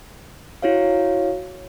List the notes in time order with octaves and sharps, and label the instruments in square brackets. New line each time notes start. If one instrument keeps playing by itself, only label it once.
[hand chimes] E4 F#4 C#5 F5